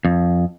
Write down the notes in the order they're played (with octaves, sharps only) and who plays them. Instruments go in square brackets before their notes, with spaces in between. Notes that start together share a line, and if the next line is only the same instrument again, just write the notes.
[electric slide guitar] F2